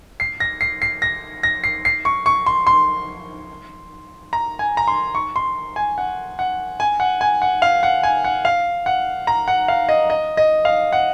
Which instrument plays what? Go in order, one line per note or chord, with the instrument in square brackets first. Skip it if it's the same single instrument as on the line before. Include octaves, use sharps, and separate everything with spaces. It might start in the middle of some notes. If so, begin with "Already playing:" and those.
[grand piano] C7
A#6
C7
C7
A#6
A#6
C7
C7
C#6
C#6
C6
C6
A#5
G#5
A#5
C6
C#6
C6
G#5
F#5
F#5
G#5
F#5
G#5
F#5
F5
F#5
G#5
F#5
F5
F#5
A#5
F#5
F5
D#5
D#5
D#5
F5
F#5